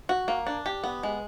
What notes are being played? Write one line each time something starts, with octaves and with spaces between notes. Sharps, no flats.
F#4
A#3
D4
G4
B3
G#3